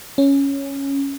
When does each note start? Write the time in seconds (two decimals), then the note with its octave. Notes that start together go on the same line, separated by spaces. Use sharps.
0.18 C#4